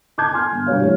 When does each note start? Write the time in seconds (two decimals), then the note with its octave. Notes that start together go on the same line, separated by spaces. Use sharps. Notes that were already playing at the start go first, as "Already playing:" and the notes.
0.18 A5 D6 G6 G#6
0.33 G#5 C6 F6
0.52 G1
0.66 G2 B2 C#5 F5
0.81 E3 G3 A3 E4